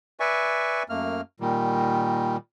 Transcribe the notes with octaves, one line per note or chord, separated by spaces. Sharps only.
B4 D5 E5 G#5 C#6
F#2 A3 A#3 F6
A#2 D#3 G3